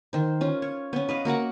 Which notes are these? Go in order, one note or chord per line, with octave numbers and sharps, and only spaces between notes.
D#3 C5
C#4 F4
C#5
B3 C#4
B4 D#5 F5
A#3 F#4 A#4 F#5